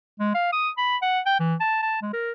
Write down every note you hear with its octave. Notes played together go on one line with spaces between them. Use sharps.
G#3
F5
D#6
B5
F#5
G5
E3
A5
A5
G#3
A#4